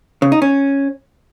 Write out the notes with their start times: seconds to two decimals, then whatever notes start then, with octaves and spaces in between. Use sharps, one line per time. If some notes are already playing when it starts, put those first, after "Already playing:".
0.22 C#3
0.32 D#4
0.42 C#4